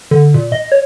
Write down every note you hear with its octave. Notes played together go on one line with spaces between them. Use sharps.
D3
A#2
D#5
C#5